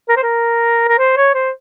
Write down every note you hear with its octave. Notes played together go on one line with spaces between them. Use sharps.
A#4
C5
A#4
A#4
C5
C#5
C5